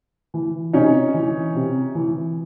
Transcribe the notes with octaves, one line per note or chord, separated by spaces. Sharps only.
E3
C3 C#4 D#4
E3
C3
E3